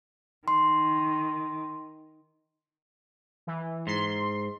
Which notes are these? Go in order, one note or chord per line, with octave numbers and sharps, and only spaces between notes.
D#3 C6
E3
G#2 C6